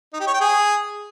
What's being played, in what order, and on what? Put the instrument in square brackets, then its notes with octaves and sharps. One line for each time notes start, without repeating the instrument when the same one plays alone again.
[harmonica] D#4
G4
C#5
G5
G#4